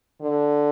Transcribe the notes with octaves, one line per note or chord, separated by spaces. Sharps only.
D3